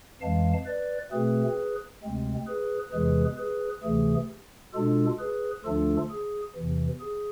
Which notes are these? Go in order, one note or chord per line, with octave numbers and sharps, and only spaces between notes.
F2 E3 G#3 F5 A5
B4 D5
B2 A3 C4 G#4 B4
D2 C3 G#3 C4
G#4 B4
E2 C3 E3 G#3 G#4 B4
G#4 B4
D2 C3 E3 A3 G#4
B2 G#3 D4 F4 A4
G#4 B4
D2 D3 F3 A3 D4 F4 A4
G#4
E2 C3 E3
G#4